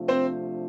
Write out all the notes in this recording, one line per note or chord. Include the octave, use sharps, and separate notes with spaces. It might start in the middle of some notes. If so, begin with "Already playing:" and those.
Already playing: C3 F3 A3 D4 F4
C4 C5